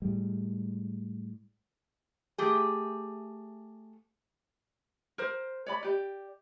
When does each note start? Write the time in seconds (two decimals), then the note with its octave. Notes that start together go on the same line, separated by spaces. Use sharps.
0.02 A2 G3 G#3
2.38 A3 G4 G#4
5.18 A#4 C5
5.67 C#5 D5 B5
5.83 G4 D5